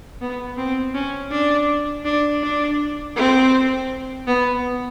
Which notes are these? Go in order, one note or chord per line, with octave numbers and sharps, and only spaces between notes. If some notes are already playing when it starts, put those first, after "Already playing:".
B3
C4
C#4
D4
D4
D4
C4
B3